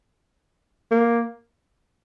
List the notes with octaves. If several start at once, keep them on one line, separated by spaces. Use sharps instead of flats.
A#3